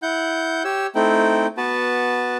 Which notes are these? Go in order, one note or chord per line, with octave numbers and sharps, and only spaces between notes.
E4 F#5 G6
G4 C#5 E6
A3 C4 D#4 E4 G5
B3 F#4 B4 A5